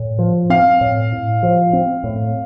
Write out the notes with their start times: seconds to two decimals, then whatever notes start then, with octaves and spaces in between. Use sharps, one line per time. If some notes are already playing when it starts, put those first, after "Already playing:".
Already playing: A2
0.19 F3
0.50 C4 F5
0.81 A2
1.12 A2
1.43 F3
1.73 C4
2.04 A2